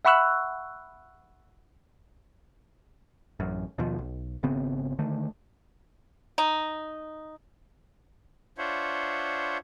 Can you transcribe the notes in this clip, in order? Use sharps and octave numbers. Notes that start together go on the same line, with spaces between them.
E5 F#5 B5 C#6 E6 F#6
A1 F#2
D#2 B2 F3
B1
G#1 C#3 B3 C4
D3 D#3 A3
D#4
D4 F4 C5 C#5 E5 F#5